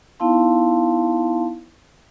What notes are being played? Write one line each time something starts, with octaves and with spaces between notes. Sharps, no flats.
B3 D#4 E4 F5 A5 C6